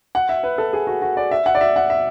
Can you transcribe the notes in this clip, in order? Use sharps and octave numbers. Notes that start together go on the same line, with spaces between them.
F#5
E5
B4
A4
G#4
F#4
F#4
D5
E5
F#5
D5
E5
F#5
E5